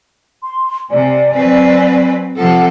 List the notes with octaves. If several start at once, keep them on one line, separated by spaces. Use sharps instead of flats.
C6
C3 D5 G#5
F#3 C4 B4
C3 F3 A4 F#5